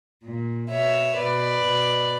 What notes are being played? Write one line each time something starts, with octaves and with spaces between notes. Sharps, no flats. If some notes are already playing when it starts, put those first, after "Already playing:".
A#2
B2 C#5 E5
B2 B4 D5
B2